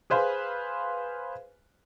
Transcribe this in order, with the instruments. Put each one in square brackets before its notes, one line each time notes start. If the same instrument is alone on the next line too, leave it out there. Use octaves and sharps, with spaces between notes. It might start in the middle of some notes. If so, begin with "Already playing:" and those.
[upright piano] G#4 B4 C5 F5 G#5